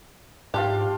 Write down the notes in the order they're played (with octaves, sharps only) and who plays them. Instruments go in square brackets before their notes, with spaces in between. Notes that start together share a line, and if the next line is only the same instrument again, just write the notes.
[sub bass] G#2 [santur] D4 F4 F5 [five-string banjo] G4